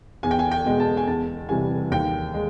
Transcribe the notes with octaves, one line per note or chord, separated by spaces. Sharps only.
E2 G#5
G5
G#5
G5
B2 G#3
A5
G#5
E2 A5
C3 E3 G3 G#5
D#2 G5
G#3